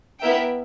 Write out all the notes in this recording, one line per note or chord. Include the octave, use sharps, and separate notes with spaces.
B3 E4 A#4 E5 G5